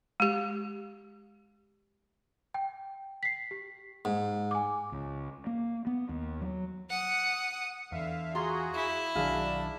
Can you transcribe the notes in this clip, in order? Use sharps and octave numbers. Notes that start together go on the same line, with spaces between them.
G#3 G4
G5
B6 C7
G4
G#2
G#5 D6
C#2
A#3
B3
D#2
F#3
F#5 D#6
E2 D3 E5 F5
F4 F#4 G#4 A#5 C6
E4
B1 D#3 F#3 D4 F#4 G#4 F5